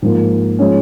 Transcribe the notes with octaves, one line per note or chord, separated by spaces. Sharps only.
G#2 F3 A#3
F3 G#3 C#4